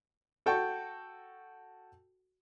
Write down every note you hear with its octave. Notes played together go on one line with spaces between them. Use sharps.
F#4 A4 G5 A5 C#6